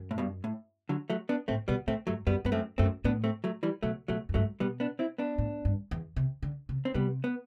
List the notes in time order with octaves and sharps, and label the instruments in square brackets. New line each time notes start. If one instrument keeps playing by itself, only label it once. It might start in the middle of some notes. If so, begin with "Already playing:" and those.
Already playing: [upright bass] F#2
[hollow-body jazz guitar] A2
G2 B2
A2
D3 F#3
F#3 A3
B3 D4
[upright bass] A2 [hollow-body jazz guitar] A3 C4
[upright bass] B2 [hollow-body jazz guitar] G3 B3
[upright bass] A2 [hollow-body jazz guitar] A3 C4
[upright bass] G2 [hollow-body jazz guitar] F#3 A3
[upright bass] F#2 [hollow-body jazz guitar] G3 B3
[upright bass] G2 [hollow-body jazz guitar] B3
[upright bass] F#2 [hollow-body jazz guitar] A3 C4
[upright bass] F#2 [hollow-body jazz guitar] A3 C4
[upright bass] A2 [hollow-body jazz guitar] B3 D4
[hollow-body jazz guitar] A3 C4
F#3 A3
E3 G3
[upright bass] B2 [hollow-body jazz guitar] F#3 A3
[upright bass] B2 [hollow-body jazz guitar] F#3 A3
[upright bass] F#2
[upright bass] G2 [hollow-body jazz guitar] F#3 A3
[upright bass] B2 [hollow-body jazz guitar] G3 B3
[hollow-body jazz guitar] B3 D4
C4 E4
B3 D4
[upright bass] A2
G2
E2
C3
D3
C3
[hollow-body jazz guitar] C4
[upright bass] C3 [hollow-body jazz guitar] G3 B3
[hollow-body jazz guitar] B3